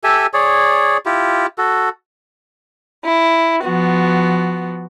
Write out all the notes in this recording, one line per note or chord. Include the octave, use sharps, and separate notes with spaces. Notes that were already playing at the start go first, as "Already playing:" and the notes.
G4 A4 E5 G#5
G#4 C#5 D5
E4 F4 G4
F#4 A4
E4
F3 B3 F#4